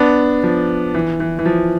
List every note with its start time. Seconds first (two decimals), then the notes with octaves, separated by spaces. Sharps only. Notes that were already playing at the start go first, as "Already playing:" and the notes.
Already playing: B3 D4
0.43 F3
0.95 E3
1.20 E3
1.39 E3
1.45 F3